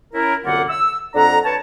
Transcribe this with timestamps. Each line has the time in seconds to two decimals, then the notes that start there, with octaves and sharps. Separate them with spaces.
0.13 C#4 E4 A#4
0.45 C2 F#2 D3 A#3 F4 F#5
0.69 E6
1.15 F2 D4 A4 F#5 A#5
1.45 B4 C#5 A5